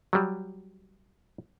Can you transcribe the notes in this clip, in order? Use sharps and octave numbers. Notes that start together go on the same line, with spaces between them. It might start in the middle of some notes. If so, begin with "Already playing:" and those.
F#3 G3